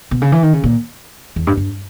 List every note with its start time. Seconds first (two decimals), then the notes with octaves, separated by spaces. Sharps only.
0.11 B2
0.22 C#3
0.32 E3
0.43 D#3
0.53 C#3
0.64 A#2
1.36 E2
1.47 G2
1.57 G2